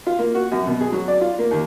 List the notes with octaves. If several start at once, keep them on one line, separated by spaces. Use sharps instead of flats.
F4
A#3
F#4
F#2
B2
G#4
F#3
D5
F4
A#3
D#2